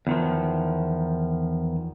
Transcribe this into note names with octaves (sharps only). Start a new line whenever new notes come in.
E2 D#3 F3